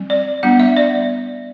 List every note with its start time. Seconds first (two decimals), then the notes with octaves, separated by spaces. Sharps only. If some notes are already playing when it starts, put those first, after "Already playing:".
Already playing: G3 C4
0.10 D5
0.43 G3 B3 D4 F#5
0.60 E5
0.77 D5